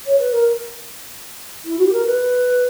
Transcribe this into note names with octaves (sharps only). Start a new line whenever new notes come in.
C#5
B4
A#4
E4
F#4
G4
A#4
B4